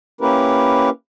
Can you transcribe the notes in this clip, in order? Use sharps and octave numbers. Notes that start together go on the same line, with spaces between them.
A#3 C#4 E4 G4 A#4 B4